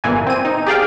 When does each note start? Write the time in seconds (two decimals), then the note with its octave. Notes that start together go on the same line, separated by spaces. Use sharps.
0.04 G1 A#2 E3 G#5
0.27 C4 D#7
0.45 D#4
0.67 G4 G#4 D5 F5 G5